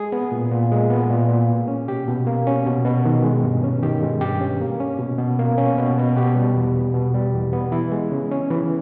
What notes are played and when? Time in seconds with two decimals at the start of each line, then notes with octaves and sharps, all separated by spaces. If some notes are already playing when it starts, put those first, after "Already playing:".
Already playing: G#3 G#4
0.12 B3
0.32 A#2
0.51 A#2
0.72 G#3
0.90 B3
1.10 A#2
1.29 A#2
1.49 A#3
1.68 C#4
1.88 B2 G4
2.08 B2
2.27 A#3
2.47 C#4
2.66 B2
2.85 B2
3.05 D#3
3.24 G#3
3.44 G2
3.64 C#4
3.83 D#3 G4
4.03 G#3
4.21 G2 G4
4.41 C#4
4.61 A#3
4.80 C#4
4.99 B2
5.19 B2
5.39 A#3
5.58 C#4
5.78 B2
5.98 B2
6.17 B2 G4
6.36 G3
6.56 E2
6.76 B3
6.94 B2
7.14 G3
7.34 E2
7.53 B3
7.72 E3 E4
7.92 G#3
8.12 C#3
8.31 C#4
8.50 E3